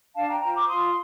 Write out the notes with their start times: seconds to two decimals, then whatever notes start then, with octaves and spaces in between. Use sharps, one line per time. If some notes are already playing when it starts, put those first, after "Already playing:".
0.15 D4 F5 A5
0.28 G5 A#5
0.41 F4 C5 G5 A#5
0.54 A#5 D6
0.68 F4 C6 D#6